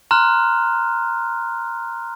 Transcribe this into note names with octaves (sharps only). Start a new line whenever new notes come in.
A#5 C6 F6 F#6